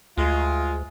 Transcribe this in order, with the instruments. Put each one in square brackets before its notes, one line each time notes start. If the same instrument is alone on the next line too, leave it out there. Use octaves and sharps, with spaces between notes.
[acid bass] D2 [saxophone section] G#3 F4